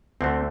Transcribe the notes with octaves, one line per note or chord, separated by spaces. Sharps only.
D2 D3 A3 C4